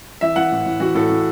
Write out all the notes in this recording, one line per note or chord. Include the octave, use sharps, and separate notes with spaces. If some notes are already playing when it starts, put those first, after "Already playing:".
E3 E5
E3 F#5
A2
A2
E3 F#4
A2 A4
A2